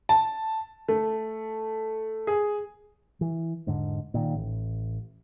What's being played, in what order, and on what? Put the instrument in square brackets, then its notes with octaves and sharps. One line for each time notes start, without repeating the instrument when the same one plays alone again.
[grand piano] A5
A3
G#4
[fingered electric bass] E3
E1 G#2 D3
A#2 D#3
A1